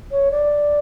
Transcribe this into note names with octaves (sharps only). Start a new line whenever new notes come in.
C#5
D5